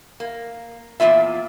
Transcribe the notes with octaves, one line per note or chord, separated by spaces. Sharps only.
A#3
E2 A#2 A#3 F4 E5